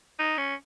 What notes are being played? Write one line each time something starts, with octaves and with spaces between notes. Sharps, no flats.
D#4
C#4